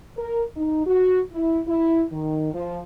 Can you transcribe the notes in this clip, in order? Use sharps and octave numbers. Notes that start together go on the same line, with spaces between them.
A#4
D#4
F#4
E4
E4
D#3
F3